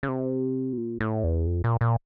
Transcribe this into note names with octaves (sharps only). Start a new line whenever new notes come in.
C#3
C3
B2
A#2
A2
E2
F2
A#2
A#2